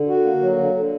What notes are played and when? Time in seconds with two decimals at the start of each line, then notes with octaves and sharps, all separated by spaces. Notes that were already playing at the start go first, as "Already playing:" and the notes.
Already playing: D3
0.08 F#4
0.24 A#3
0.42 F#3
0.57 D3
0.74 D3